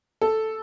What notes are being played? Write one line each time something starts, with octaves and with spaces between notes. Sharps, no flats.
A4